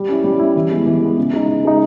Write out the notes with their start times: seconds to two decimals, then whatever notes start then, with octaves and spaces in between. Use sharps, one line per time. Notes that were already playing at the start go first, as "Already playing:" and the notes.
Already playing: G3
0.09 C#4 E4
0.24 G3
0.39 C#4 E4
0.56 E3
0.71 G#3 B3
0.86 E3
1.02 G#3 B3
1.18 C#3
1.33 G#3 D#4
1.48 C#3
1.65 G#3 D#4